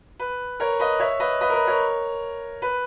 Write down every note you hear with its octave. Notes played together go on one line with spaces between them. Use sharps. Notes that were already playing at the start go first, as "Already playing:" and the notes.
B4
A#4 C#5
B4 D#5
C#5 E5
B4 D#5
B4 D#5
A#4
B4
A#4 C#5
B4